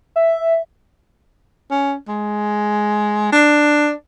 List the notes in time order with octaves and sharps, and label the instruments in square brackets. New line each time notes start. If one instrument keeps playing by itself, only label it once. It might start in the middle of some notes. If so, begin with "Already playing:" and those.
[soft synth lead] E5
[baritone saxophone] C#4
G#3
D4